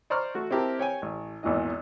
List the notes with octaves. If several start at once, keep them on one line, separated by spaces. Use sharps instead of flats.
C5 D5 A#5 C6 C#6 F6
A3 F#4
C4 E4 G4 A#4 A5
C#5 G5 G#5
A1
G#1 E2 A#2 E3 D#5